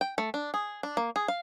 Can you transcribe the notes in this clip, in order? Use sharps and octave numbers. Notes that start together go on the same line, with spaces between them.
G5
A3
D4
G#4
D4
A#3
G#4
F5